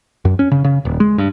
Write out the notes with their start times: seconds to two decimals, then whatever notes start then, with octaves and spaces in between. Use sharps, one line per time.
0.25 F#2
0.39 C#4
0.51 C#3
0.64 C#3
0.85 D#1
1.00 G#3
1.18 G2